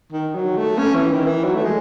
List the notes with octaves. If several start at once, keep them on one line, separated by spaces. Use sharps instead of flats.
D#3
F#3
A3
C#4
E3
D#3
E3
F#3
A3
G#3